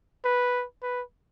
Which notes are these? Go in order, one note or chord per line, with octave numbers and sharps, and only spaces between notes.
B4
B4